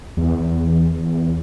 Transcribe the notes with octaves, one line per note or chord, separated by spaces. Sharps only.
E2